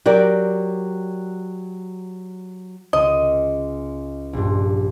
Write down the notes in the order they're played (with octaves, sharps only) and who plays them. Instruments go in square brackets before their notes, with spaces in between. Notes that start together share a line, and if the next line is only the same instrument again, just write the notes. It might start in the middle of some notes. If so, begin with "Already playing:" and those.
[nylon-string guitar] F#3 G4 A#4 D5
[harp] C#2 [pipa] D#5
[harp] A#1 G2